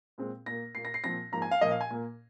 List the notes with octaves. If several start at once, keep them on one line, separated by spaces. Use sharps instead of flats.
A#2 G#3 C4
A#2 A#3 A#6
A#2 A#3 C7
A#6
C7
A#2 F3 C4 A#6
G#2 F3 A#3 A#5
G#5
F5
A#2 F3 A#3 D#5
F5
G#5
A#2 A#3